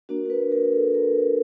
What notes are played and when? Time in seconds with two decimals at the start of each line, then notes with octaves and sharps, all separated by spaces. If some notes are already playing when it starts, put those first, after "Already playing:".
0.09 A#3 D4 F#4 A#4
0.26 A#4
0.30 B4
0.52 A#4
0.73 A4
0.94 A#4
1.16 B4